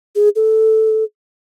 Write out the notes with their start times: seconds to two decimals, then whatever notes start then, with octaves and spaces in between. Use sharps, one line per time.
0.15 G#4
0.36 A4